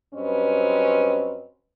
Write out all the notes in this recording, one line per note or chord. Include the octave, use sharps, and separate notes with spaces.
G2 F#3 C4 C#4 B4 D#5